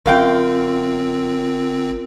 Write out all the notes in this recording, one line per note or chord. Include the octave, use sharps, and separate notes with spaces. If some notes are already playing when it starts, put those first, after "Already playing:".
G1 F#2 C4 F4 A#4 F5 G5